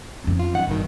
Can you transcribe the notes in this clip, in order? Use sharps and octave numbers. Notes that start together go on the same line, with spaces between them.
F2 C#4
F4
F#2 D#3 F#5
G#1 G2 B2 D#3